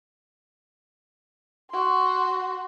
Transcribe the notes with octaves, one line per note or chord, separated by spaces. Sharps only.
F#4 C6